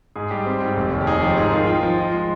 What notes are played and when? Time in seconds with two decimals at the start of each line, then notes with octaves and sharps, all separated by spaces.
0.16 G#2 G#4
0.31 G3 G4
0.46 C4
0.62 G#2
0.77 F1
0.92 D#2
1.01 G4
1.07 D#4 G#4
1.22 F3 G4
1.36 G#2 G#4
1.52 D#3 F5
1.67 F4 G5
1.83 F3
1.97 F4 D#5
2.13 G#3